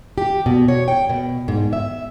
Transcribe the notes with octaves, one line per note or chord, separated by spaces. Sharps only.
G4
B2
C#5
G5
B2
G#2
E5